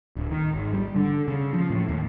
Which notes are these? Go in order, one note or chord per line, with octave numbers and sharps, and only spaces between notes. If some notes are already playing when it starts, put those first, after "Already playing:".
D1
D#3
G#1
G3
D3
C#3
F3
A2
D#2